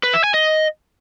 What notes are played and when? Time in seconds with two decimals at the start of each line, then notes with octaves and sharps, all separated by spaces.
0.03 B4
0.14 E5
0.24 G#5
0.34 D#5